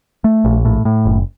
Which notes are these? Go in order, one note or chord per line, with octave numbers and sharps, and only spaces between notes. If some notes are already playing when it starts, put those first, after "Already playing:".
A3
A#1
A2
A2
F#1